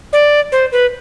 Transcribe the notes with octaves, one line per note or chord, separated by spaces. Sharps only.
D5
C5
B4